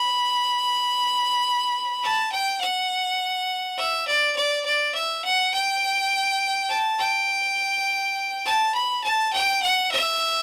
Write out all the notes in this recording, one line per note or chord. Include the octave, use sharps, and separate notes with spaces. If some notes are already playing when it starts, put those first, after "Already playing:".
Already playing: B5
A5
G5
F#5
E5
D5
D5
D5
E5
F#5
G5
A5
G5
A5
B5
A5
G5
F#5
E5